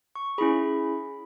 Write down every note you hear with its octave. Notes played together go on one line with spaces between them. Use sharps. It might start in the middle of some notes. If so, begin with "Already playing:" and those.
C#6
C#4 E4 G#4 B5